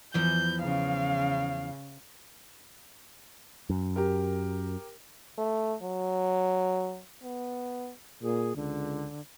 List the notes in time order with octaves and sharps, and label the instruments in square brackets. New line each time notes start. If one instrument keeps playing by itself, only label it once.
[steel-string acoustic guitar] E2 E3 F3 [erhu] G6
[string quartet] C#3 [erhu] F5
[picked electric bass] F#2
[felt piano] G4 A#4
[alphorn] A3
F#3
B3
[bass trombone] A#2 [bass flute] G#4
[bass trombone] C#2 [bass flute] D3